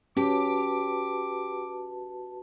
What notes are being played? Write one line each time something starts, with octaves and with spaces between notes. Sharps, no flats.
C#4 F#4 G4 B4 A5 D6